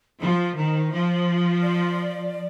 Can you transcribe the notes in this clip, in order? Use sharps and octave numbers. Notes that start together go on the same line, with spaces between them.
F3 C5
D#3
F3
D5